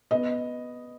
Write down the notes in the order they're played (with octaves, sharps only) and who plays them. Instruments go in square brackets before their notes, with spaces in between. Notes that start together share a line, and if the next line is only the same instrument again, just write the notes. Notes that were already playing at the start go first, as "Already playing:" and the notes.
[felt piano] B3 D#5